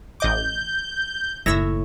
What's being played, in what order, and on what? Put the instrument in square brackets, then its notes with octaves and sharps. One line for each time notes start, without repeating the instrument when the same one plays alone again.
[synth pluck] A1 D#5 D6 [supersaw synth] G6
[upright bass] F#1 [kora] A2 C#5 E5 [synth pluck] E6 A#6